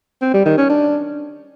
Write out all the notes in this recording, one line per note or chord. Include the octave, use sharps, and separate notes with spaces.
C4
G3
D#3
C#4
D4